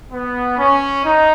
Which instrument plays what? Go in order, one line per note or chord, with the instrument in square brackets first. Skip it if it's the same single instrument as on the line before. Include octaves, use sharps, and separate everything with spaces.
[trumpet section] B3
C#4
D#4